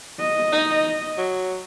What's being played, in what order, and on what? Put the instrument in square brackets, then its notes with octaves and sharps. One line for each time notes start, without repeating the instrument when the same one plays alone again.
[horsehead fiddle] D#5
[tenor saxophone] D#4
F#3